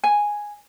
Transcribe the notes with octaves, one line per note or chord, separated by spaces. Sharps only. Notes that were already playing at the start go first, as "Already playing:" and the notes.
G#5